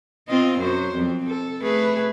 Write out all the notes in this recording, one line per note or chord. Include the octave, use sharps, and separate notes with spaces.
C4 F4 D#5
F#2 F#3 C5
F2 C4
A4
A3 G#4 B4